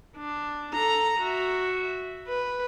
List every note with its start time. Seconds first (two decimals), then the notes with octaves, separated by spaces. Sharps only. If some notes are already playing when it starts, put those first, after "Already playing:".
0.17 D4
0.73 A4 A#5
1.19 F#4 E5
2.28 B4